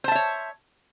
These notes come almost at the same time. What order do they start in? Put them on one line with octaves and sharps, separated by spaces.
C5 A5 E5 C#5